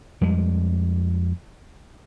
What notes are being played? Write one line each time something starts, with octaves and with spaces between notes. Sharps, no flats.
F2 G3 G#3